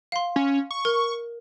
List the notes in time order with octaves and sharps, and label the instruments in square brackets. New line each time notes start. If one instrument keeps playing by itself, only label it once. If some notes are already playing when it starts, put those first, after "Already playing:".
[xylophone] F5 C6
[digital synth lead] C#4
C#6
[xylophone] A#4